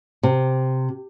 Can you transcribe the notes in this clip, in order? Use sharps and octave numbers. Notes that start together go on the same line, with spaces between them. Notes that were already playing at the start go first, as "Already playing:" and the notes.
C3